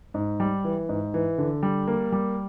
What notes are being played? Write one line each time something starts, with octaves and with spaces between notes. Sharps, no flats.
G#2
G3
E3
G#2
E3
D3
G3
A#3
G3